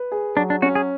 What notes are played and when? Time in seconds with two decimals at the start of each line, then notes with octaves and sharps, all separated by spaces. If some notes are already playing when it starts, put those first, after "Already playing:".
Already playing: B4
0.12 G#4
0.37 F#3 D4
0.50 D4
0.62 C#4 F#4
0.75 G#4